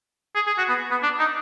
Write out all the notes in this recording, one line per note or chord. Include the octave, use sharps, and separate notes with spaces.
G#4
G#4
F#4
B3
B3
D4
D#4